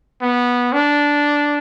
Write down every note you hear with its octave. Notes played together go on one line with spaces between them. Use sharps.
B3
D4